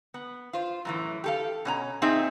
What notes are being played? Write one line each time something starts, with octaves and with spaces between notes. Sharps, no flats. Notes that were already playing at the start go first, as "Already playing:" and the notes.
B3
F4 C5
F#2 A2 E3
G4 A4 F5
B2 C#4 A#5
A#2 C4 D#4 G#4 E5